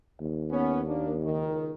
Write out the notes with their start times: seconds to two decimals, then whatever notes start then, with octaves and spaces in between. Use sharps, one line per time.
0.21 D#2
0.51 B3 C#4
0.87 A#3 D4
1.23 C#2 D#3